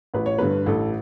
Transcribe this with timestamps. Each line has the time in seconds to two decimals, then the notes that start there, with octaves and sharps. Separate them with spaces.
0.14 A1 B4
0.26 C#5
0.38 G2 D3 B4
0.66 A1 A4